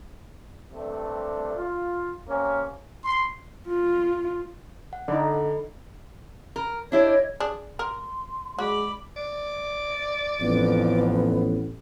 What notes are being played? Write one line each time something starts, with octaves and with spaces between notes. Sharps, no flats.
G2 C3 G3 A3 D4
F4
C3 A#3 C#4
C6
F4
F#5
D3 D#4 A4 D5 B5
A#4
D4 E4 G4 C#5 D#5 G#6
D4 G#4
A#4 C6
G#3 F#4 D5 B5
D5
A1 F2 B3